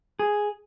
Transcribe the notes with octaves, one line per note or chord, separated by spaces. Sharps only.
G#4